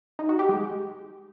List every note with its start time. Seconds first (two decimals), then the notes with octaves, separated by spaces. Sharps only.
0.19 D#4
0.29 F#4
0.39 G4
0.49 G#3